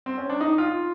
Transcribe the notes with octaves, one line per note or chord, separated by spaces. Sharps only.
C4
C#4
D4
D#4
F4